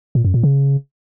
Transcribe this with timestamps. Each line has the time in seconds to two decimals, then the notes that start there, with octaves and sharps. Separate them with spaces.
0.15 A#2
0.25 F#2
0.34 A#2
0.43 C#3